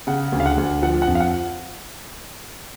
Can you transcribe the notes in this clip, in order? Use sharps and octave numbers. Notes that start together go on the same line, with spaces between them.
C#3 F#5
D2
F5
F#5
D2
F3 F#5
F#5
F2
F5
F#5